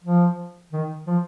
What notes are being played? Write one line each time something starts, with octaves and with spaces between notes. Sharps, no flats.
F3
D#3
F3